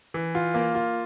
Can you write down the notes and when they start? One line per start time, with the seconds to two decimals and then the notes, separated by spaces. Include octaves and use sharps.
0.14 E3
0.35 F4
0.54 A#3
0.75 F4